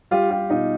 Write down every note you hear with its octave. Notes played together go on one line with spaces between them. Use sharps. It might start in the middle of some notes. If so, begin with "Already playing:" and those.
G3 F4 G4
F4 G4
B2 D#4 F4